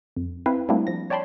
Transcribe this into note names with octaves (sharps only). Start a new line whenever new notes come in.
F2
C4 E4 B4 F5
G3 A3 A#3 C4 D4 E4
F3 A#6
C#5 D5 G5 A5 B5 C6